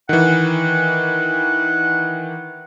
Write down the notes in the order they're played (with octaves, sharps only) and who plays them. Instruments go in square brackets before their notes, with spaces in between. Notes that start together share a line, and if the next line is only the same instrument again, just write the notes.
[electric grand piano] D#3 E3 [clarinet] F#5